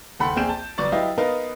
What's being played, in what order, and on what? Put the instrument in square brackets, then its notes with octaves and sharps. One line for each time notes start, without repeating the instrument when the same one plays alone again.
[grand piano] F#1 D#2 A4 F#5 B5 C6
A#1 C4 G#4 G6 D7 E7
A5
G1 F#3 B3 D5 C#6 A6
F#3 E4 G4 B4 D#5 F5
B3 D#4 A#4 B4 D#5 F5